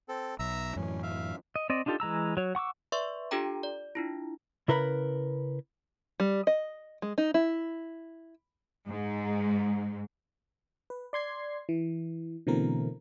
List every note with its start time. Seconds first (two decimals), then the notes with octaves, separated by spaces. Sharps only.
0.09 C4 A4
0.39 B1 E5 A#5 E6
0.76 F#2 A2 E3 C#4
1.03 E5 F5
1.56 D#5
1.70 C4 D5 D#5
1.86 D4 D#4 F4 G4 A4
2.00 E3 G#3 A#5 E6
2.37 F#3 C#5
2.55 F#5 C#6 D6 E6
2.92 B4 D5 E5 C6 C#6
3.31 D4 F4 G4 A4 G5 A#5
3.63 D5
3.95 D4 E4 F4
4.68 C#3 E4 A#4 B4 D5 B5
6.20 G3
6.47 D#5
7.02 G#3
7.18 D#4
7.34 E4
8.88 G#2
10.90 B4
11.13 D5 C6 G#6 C7
11.69 E3
12.47 B2 D3 E3 A3 C4 A#4